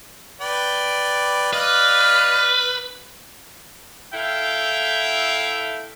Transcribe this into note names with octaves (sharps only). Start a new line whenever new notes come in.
B4 D5 G5
B4 D5 D#5 F5 F6
E4 A4 E5 F5 G5